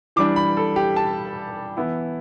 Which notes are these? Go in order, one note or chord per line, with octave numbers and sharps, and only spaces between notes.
E3 G3 D4 D6
B5
A4
G4
A5
E3 B3 E4